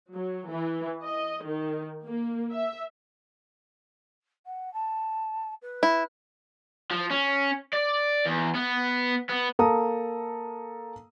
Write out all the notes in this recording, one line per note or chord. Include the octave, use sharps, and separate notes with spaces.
F#3
E3
D#5
D#3
A#3
E5
F#5
A5
B4
E4
F3
C#4
D5
E2
B3
B3
A#3 A4 F5 A#5 D#6